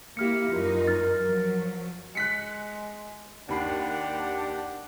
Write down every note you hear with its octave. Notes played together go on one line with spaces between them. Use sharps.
A#3 E4 G4 F6 C#7
F#2 D#4 F4 A#4
F6 A6
F3 F#3
G#3 F#6 B6 C#7
D#2 D4 G4 F#5 B5 C7